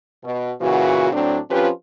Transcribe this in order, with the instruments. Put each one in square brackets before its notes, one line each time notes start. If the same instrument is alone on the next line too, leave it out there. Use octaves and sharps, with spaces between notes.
[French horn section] B2
A#2 C#3 E3 F#4
A2 F#3 C4 D4
F3 C4 C#4 F4 G4 B4